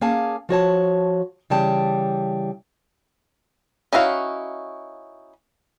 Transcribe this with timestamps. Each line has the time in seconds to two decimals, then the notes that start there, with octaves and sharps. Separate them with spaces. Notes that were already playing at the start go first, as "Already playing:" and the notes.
0.01 A#3 C#4 G#4 F5 G#5 A5
0.49 F3 F#4 C#5 A5
1.50 C#3 E3 G3 G5 A5
3.93 C#4 D#4 E4 F#4 F5